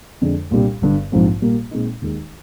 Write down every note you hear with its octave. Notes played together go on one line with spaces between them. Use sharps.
F2 D3 G#3 D4
C2 A#2 G3 D4 G4
G1 G2 D3
A#1 G#2 F3 C4
A#2 G3 A#3
A#2 G#3 C4 D#4
D#2 D#3 G#3 D#4